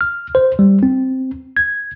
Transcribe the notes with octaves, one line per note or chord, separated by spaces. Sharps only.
F6
C5
G3
C4
G#6